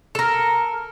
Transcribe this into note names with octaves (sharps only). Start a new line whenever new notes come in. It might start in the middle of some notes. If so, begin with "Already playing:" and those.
A4 A#4